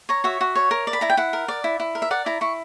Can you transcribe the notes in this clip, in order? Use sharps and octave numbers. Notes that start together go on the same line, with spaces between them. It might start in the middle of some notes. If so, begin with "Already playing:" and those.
C#5 A#5
F#4 E5
F#4
C#5
A#4
D5
B5
E4 A#5
G5
E4 F#5
A#4
D5
E4
E4
A#4
E5
D5 F#5
E4 A#5
E4 C#6